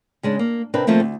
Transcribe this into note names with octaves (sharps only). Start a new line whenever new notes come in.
C#3 G#3 D4
A#3
C3 C4 D4 A#4 B4
D#3 F3 A3 A#3 C4 E4
D2